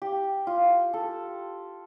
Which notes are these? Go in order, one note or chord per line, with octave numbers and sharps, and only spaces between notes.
G4
F4
A4